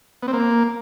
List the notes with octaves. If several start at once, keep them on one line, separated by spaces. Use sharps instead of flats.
B3
C4
A#3